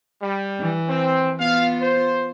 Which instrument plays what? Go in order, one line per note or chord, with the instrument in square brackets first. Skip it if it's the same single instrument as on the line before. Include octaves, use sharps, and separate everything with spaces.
[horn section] G3
[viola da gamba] E3
[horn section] C4
[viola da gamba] B3 F4 [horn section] F5
[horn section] C5